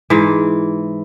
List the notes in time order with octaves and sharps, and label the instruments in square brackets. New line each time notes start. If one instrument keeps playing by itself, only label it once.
[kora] G#2 E3